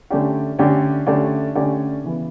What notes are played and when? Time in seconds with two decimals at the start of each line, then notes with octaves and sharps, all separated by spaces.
0.10 D3 A3 C#4 G4 D5
0.59 D3 A3 C#4 G4 D5
1.07 D3 A3 C#4 G4 D5
1.55 D3 A3 C#4 G4 D5
2.04 C#3 E3 B3